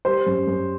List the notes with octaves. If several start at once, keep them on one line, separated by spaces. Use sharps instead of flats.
G3 C5
F#2
F#2